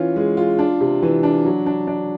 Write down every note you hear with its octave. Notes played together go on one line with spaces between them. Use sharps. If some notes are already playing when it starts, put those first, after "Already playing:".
Already playing: E3 C#4 F4
G#3
F4
D4
C3
E3
D4
F#3
D4
D4